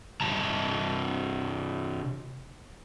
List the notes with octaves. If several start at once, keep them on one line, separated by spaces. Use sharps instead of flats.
G2 C3 A5 A#5